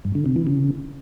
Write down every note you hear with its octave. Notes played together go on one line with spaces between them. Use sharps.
G2
D3
C3
E3
C#3